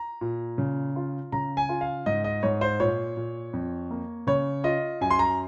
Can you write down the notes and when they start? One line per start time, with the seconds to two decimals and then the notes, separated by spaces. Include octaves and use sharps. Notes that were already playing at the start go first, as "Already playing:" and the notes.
Already playing: A#5
0.21 A#2
0.58 C#3
0.96 F4
1.32 C#3 A#5
1.57 G#5
1.69 F4
1.81 F5
2.06 G#2 D#5
2.24 D#5
2.43 G#2 C#5
2.61 C5
2.80 A#2 C#5
3.17 A#2
3.53 F2
3.91 A#3
4.27 C#3 C#5
4.64 F4 D#5
5.01 F#2 G#5
5.11 C6
5.19 A#5